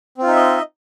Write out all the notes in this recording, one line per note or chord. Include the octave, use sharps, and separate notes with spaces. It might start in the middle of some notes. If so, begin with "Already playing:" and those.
C4 D#4 F4 D#5 E5